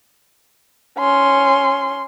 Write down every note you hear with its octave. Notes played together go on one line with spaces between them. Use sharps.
C#4 C6